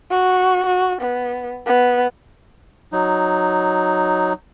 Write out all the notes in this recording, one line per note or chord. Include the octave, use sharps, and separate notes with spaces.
F#4
F#4
B3
B3
F#3 D#4